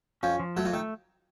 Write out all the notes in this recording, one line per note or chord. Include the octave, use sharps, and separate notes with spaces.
F2 F3 C#4
F3
F#2 F#3 A3
F2 F3
D#3 A3